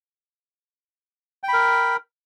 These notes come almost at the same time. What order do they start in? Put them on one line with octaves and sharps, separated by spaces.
G5 B5 A#4